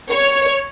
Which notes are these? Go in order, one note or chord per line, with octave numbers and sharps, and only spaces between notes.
C#5